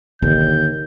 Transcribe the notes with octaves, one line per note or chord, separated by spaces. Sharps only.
D#2 D3 G6